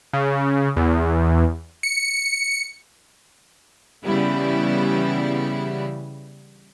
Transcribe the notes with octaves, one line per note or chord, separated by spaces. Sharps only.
C#3
E2
C#7
C#3 E3 G3 B3 E4